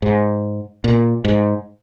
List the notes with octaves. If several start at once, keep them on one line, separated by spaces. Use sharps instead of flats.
G#2
A#2
G#2